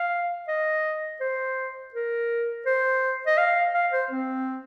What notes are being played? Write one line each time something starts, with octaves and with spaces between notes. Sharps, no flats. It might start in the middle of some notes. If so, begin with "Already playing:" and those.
Already playing: F5
D#5
C5
A#4
C5
D#5
F5
F5
C5
C4